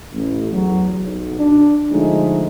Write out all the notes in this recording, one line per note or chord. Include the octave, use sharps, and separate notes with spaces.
A1
E2 F#3
B1
D4
D3 F3 G#3 A3 D#4